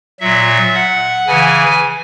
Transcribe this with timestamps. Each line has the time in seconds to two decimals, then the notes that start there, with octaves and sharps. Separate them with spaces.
0.20 A#2 F#3 E5
0.75 F#5
1.27 C#3 E3 G#5